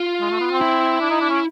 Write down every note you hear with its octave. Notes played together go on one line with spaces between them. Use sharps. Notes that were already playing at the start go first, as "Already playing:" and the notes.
Already playing: F4
G#3
A3
B3
C4
E4
D4
D#4
D4
C#4